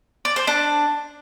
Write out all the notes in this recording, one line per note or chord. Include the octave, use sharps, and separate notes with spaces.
D5
C5
D4